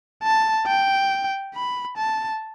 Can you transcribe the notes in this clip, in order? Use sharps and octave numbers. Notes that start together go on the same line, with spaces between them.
A5
G5
B5
A5